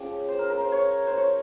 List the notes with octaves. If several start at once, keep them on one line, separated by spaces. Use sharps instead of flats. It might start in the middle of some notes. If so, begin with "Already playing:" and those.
Already playing: F3 G#3 C#4 G4
C5
A#4
A#4
C5
C#5
C5
C#5